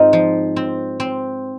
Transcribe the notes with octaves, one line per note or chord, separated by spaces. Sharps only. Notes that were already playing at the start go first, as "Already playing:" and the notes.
Already playing: G#2 C4 D#4 F4
F3
C4
C4